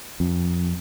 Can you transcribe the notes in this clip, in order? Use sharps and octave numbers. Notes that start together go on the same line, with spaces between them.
F2